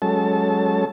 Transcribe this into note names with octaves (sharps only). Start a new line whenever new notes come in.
F#3 G#3 C#4 A4 A5